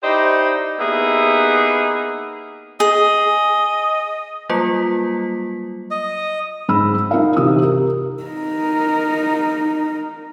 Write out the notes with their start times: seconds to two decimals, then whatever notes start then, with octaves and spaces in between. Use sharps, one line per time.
0.04 D#4 E4 G4 C5 D5 D#5
0.79 A#3 B3 D#4 E4 G4 G#4
2.80 G#4 D#5
4.50 F#3 G3 A#3 F4 B6
5.91 D#5
6.69 G#2 B5 E6
7.11 D#4 A#4 F5
7.36 C3 E3 D#4 D#6 E6
7.63 G4 A#4
8.23 D#4 A#4